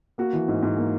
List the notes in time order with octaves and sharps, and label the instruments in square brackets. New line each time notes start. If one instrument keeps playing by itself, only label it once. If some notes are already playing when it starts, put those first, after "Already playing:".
[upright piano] A#3 F#4
E3
G#2
G#2
A#3